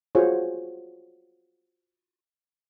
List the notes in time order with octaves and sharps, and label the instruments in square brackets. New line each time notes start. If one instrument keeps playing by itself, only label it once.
[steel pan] F4 F#4 G#4 C5 C#5